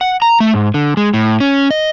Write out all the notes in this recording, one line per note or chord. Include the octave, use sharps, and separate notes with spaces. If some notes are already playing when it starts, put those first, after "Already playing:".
F#5
A#5
A3
G#2
D3
G#3
A2
C#4
D#5